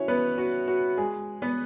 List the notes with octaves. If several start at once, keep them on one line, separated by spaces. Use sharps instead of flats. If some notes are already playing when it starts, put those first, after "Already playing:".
Already playing: C#4 E4 F#4 C#5
B3 B4
F#4
F#4
G#3 G#4
B3 B4